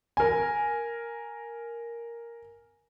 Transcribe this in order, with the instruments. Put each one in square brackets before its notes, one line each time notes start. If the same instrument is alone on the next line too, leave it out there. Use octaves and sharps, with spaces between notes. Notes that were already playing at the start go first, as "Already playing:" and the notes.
[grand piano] A#4 G#5